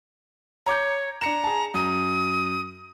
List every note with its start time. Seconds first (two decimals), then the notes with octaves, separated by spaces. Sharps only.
0.66 C#5 A#5 D6 G6
1.21 D4 A#5 C#7 E7
1.44 G#4 A5
1.74 F#2 D#6